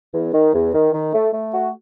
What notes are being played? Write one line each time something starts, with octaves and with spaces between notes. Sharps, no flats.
E2
D#3
E2
D#3
D#3
A3
A3
F#4